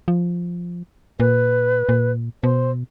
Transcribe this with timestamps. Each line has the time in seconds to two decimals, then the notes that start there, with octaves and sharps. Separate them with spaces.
0.08 F3
1.20 A#2 B4
1.89 A#2
2.43 B2 C5